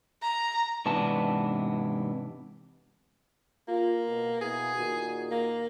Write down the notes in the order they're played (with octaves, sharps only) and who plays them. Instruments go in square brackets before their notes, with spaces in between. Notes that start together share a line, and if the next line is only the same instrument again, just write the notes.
[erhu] A#5
[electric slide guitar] G#2 C3 E3 B3 D4 A5
[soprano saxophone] A#3 [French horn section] F4
[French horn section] B2
[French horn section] B2 B3 E4 [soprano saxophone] G#4
[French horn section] A#2 D#3 F#4
[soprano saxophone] A#3